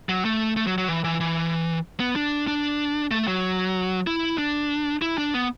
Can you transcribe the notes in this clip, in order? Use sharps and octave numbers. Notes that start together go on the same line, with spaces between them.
F#3
A3
A3
F#3
F#3
E3
E3
E3
B3
D4
D4
A3
F#3
E4
D4
E4
D4
B3